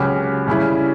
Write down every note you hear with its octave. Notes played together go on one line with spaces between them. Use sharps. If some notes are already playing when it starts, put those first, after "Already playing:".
Already playing: C#2 C#3 F#3 C#4 G4
C#3 G3 C#4 E4